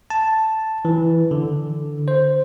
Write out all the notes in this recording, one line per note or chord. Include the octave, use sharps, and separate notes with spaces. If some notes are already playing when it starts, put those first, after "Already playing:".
A5
E3
D3
C5